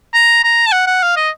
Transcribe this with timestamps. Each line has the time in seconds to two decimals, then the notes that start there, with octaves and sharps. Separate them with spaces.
0.14 A#5
0.44 A#5
0.67 A5
0.72 F#5
0.87 F#5
1.03 F5
1.16 D#5